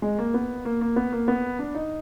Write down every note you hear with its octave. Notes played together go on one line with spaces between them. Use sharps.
G#3
A#3
B3
A#3
A#3
B3
A#3
B3
D4
D#4